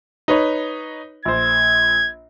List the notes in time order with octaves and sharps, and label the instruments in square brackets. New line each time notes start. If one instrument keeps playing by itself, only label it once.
[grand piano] D#4 B4 C#5
[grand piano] A#1 C5 [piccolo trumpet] G#6